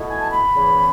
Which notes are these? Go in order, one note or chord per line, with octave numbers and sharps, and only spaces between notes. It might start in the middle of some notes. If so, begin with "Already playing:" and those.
Already playing: B2 A3 E4
G#5
A5
B5
E2 C#3 E3